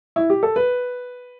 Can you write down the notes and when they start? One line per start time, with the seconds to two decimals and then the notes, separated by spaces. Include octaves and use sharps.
0.16 E4
0.30 G4
0.43 A4
0.56 B4